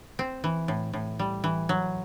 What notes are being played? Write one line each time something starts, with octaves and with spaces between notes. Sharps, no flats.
C4
E3
A2
A2
G3
E3
F#3